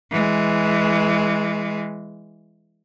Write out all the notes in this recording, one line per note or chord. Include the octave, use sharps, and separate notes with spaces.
E3 G#3